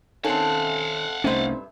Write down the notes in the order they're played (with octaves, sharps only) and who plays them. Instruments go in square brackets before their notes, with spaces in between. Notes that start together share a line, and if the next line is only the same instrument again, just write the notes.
[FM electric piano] D#3 C#4 G#5 [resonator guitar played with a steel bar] C4 A4 [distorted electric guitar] F5 F#5
[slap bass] C2 A3 C#4 [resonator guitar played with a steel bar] G2 E5 [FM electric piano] C4 D#4 C5